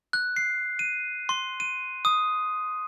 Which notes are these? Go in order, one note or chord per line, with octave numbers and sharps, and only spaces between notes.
F#6
C7
D#7
C6
D#7
D#6